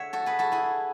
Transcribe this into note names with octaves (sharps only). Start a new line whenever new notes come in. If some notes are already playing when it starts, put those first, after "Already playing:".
Already playing: D3 G#3 C#5 E5 F#5
F#4 A4
G#4 B4
F#4 A4
E4 G#4